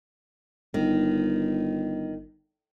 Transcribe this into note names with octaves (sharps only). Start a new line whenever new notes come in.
G1 D#3